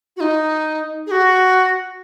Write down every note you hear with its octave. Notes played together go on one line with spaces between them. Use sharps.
F#4
D#4
G#4
F#4